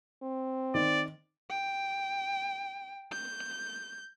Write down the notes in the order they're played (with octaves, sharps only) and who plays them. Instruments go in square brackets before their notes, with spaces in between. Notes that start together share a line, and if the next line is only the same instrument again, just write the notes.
[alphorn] C4
[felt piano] D#3 [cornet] D5
[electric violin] G5
G6